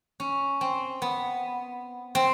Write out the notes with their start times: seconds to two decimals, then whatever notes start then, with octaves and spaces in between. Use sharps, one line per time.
0.20 C#4
0.61 C4
1.02 B3
2.15 C4